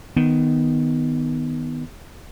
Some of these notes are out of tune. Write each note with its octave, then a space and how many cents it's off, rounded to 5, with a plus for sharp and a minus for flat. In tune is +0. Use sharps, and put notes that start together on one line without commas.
D#3 +0 B3 +5